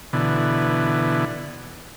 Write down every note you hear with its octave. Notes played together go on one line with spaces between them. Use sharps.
B2 D3 E3